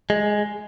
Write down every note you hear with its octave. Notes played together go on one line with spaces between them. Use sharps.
G#3